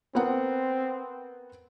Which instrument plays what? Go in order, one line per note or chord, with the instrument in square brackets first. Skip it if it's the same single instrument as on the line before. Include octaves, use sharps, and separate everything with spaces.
[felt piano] B3 A#4 F#5 [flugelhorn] C4